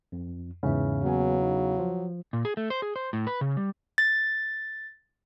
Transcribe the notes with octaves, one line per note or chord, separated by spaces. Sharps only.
F2
E2 G#2 C#3 E5
F#3 A#3 B3 G#5
D#4
F3
A#2
G#4
A3
C5
G#4
C5
A2
B4
C#3
G3
A6